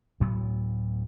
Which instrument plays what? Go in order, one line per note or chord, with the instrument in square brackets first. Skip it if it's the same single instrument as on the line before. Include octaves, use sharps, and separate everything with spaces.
[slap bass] D2 A2 F#3 B3